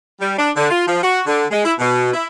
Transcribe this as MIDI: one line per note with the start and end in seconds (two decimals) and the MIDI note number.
0.20 0.34 55
0.38 0.50 62
0.56 0.69 50
0.70 0.85 65
0.87 1.02 53
1.03 1.20 66
1.27 1.44 50
1.50 1.61 56
1.65 1.74 64
1.79 2.12 47
2.13 2.27 64